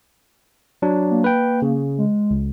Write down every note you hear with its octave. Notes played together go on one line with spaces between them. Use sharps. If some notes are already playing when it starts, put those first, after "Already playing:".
F#3 D4
A#3
B4 G5
C#3
G#3
C#2